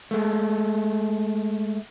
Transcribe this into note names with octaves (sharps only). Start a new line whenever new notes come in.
G#3 A3